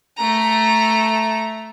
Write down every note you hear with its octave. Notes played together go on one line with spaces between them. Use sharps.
A3 A#5